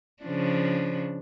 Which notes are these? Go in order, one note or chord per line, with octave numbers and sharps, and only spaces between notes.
C#3 F3 D4